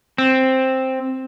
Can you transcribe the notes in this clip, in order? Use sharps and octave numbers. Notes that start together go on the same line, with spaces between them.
C4